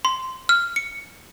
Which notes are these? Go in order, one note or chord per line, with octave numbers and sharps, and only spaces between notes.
C6
F6
C#7